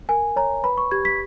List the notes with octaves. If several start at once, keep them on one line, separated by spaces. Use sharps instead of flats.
A#4 G#5
C#5 A#5
B4 B5
C#6
G4 G#6
B6